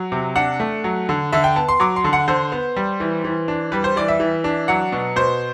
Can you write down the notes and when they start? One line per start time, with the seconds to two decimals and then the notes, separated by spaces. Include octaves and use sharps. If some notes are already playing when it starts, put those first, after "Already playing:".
Already playing: F#3
0.12 C3
0.36 D4 F#5
0.60 A3
0.84 F#3
1.09 D3
1.33 D3 E5
1.44 G5
1.56 B3 A5
1.69 C6
1.80 F#3 D6
1.96 C6
2.04 D3
2.13 F#5
2.28 D3 C5
2.52 B3
2.76 G3
3.00 E3
3.24 E3
3.48 D4
3.72 G3 B4
3.84 C5
3.96 E3 D5
4.08 E5
4.20 E3
4.44 D4
4.68 F#3 F#5
4.92 B2
5.16 B2 C5